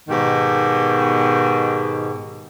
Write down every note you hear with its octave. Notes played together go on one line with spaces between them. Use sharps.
G#2 B2 D#3 G4